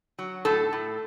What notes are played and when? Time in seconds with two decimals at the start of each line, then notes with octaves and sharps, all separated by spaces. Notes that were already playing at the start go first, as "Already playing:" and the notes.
0.19 F#3
0.45 A2 A4
0.73 A2